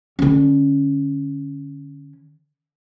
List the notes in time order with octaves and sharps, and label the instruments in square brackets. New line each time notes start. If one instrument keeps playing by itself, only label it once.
[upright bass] D3 C#4